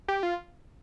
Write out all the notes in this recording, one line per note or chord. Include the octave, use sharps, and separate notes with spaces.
G4
F4